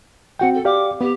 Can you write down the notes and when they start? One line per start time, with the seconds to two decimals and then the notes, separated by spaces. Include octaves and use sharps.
0.39 C4 F#4 F#5 G5
0.54 A4
0.65 G4 D5 F5 D6
1.01 B3 G4